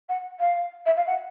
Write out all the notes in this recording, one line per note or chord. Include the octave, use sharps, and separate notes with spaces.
F#5
F5
E5
F5
F#5